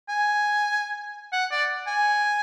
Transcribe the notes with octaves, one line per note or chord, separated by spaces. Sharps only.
G#5
F#5
D5
G#5